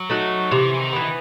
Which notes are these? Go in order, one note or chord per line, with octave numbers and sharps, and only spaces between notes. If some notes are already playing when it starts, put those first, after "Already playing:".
Already playing: F#3
A3 D#4 F#4
C3 E3
E3
D#3
E3 B3
D#3